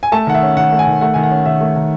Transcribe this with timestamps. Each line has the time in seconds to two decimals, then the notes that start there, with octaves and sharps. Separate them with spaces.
0.03 G#5
0.12 A3 A5
0.27 D#3 F#5
0.35 E5
0.43 C#4
0.57 D#3 F#5
0.72 A3
0.79 G#5
0.87 D#3
1.01 A3 F#5
1.14 D#3 G#5
1.23 F#5
1.31 C#4
1.46 D#3 E5
1.61 A3
1.76 D#3